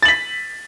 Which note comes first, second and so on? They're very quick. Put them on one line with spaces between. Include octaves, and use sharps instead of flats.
A6 F#7 B6